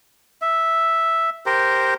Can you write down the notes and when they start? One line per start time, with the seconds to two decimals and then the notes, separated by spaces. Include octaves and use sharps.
0.42 E5
1.46 G4 A#4 C5